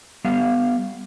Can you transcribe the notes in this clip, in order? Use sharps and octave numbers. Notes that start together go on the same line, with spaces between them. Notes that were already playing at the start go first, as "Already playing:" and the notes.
G3 B3 F5